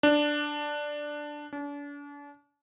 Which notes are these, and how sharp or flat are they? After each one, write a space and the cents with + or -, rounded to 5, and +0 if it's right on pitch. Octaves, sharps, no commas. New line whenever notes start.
D4 +5
D4 -40